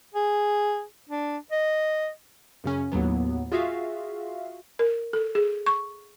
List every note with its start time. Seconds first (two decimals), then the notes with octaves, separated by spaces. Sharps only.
0.14 G#4
1.09 D4
1.51 D#5
2.64 F#2 C#3 C#4
2.92 D#2 A2 F#3 B3
3.52 F4 F#4 G#4 E5 F5
4.79 A#4
5.13 A4
5.35 G#4
5.66 C#6